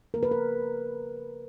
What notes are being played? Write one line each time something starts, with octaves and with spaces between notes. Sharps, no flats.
C#3 F3 A#3 A#4
B4
A#4